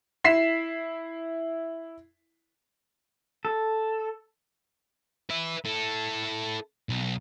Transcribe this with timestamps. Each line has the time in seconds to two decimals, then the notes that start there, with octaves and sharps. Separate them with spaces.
0.24 E4 B6 C7 E7
3.45 A4
5.30 B4 E5
5.66 E4 A4
6.89 B1